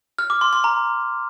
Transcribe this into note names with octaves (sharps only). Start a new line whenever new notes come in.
F6
D6
C6
C6
A#5